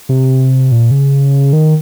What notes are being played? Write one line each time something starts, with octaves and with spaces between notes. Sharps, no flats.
C3
A#2
C#3
D#3